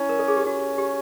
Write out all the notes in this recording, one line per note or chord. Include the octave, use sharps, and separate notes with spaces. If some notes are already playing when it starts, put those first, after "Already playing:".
Already playing: C#4 E4
A#4
A4
G#4
G4
C#4 F#4
G4